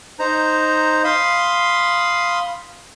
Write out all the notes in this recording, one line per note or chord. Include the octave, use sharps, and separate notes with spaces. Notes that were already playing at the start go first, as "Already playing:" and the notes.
D#4 C5 A#5
F5 B5 C6 D#6